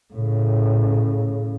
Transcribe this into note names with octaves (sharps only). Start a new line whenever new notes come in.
A2 C#3